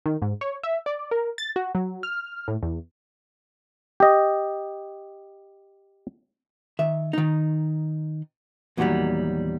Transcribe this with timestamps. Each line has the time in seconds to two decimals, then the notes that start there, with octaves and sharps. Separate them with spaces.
0.06 D#3
0.22 G#2
0.41 C#5
0.63 E5
0.86 D5
1.11 A#4
1.38 A6
1.56 F#4
1.75 F#3
2.03 F6
2.48 A2
2.62 E2
4.00 G4 D#5
6.79 D#3 E5
7.13 D#3 D#4
8.77 E2 A#2 D#3 E3 F#3 G3